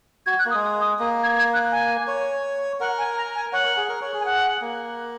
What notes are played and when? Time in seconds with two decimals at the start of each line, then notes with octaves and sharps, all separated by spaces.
0.26 F#4 G#6
0.39 F#6
0.45 A#3
0.51 D#6
0.54 G#3
0.63 D#6
0.81 D#6
0.99 A#3 D#6
1.23 G#6
1.35 G#6
1.54 F#6
1.72 G#5
2.07 C#5
2.80 A#4 F#5
2.98 G#5
3.17 A#5
3.35 G#5
3.52 C#5 F#5
3.65 A#4
3.77 G#4
3.89 A#4
4.01 C#5
4.13 G#4
4.20 G#5
4.25 F#5
4.61 A#3